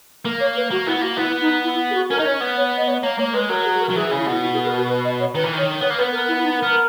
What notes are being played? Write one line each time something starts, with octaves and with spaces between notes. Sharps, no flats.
A#3 A#4
C#5
B4
A#3 F#4
B3 E4
A#3 F#4
B3 E4
D#4
E4
G#4
F#4
C#4 A#4
D#4 D#5
C#4 C#5
B3
C#5
D#5
C#5
A#3 C#5
A#3 C#5
G#3 B4
F#3 A#4
G#4
A#4
F#3
E3 G#4
C#3
E4
B2
E4
G#4
A#4
F#4
B4
D#5
C#5
D#3 B4
E3
D#3
C#5
B3 C#5
A#3
B3 B4
A#4
E4
D#4
B3 A#4